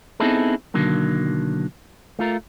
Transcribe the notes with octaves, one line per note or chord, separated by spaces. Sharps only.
B3 C4 D#4 E4 G#4 A4
B1 D3 D#3 F#3 A#3
A3 F4 A#4